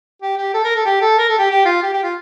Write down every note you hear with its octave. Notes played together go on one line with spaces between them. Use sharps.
G4
G4
A4
A#4
A4
G4
A4
A#4
A4
G4
G4
F4
G4
G4
F4